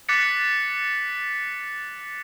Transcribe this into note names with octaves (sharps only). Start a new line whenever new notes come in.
D6 F#6 A6 B6 C#7 F#7